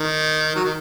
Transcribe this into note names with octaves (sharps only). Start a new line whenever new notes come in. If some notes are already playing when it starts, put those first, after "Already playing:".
Already playing: D#3
F#3
D#3